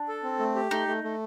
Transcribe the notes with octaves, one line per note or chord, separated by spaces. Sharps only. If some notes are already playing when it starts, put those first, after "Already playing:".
Already playing: D4
A4
C4
A3
G4
A3 D#4
A3
A3